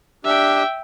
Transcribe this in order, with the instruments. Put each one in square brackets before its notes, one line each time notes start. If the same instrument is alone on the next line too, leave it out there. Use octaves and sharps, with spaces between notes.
[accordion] D4 G4 [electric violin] E5 G5